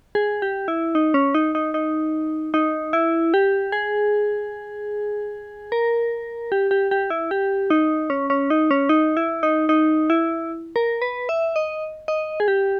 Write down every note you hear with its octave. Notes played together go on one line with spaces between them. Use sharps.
G#4
G4
E4
D#4
C#4
D#4
D#4
D#4
D#4
E4
G4
G#4
A#4
G4
G4
G4
E4
G4
D#4
C#4
C#4
D#4
C#4
D#4
E4
D#4
D#4
E4
A#4
B4
E5
D#5
D#5
G#4
G4